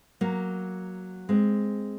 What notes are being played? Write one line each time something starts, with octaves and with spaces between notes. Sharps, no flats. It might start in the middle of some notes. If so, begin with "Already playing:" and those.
F#3 A#3
G#3 C4